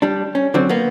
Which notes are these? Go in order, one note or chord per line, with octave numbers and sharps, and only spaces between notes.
G3 D4
C#4
D3 F#3 C4
A#3 B3